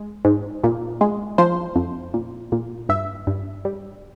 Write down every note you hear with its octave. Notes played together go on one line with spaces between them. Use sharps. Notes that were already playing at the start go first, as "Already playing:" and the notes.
Already playing: G#3
G#2
A#2
G#3
F3 C5
F2
A#2
A#2
G2 E5
G2
G3